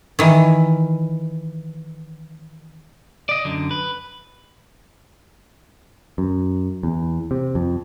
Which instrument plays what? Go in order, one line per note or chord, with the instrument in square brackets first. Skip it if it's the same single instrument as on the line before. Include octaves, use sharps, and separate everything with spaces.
[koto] D#3 E3
[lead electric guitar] D5 D#5
F#2 D3
B4
[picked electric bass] F#2
E2
C3
F2